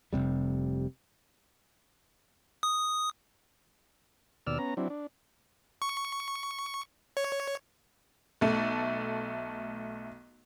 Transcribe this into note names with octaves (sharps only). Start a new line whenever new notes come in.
F1 C#2 C3 G3
D#6
D#2 B2 D5 E6 F6
B3 C#4 A#5
F#3 C4 D4 E4
D4
C#6
C#5
B1 A3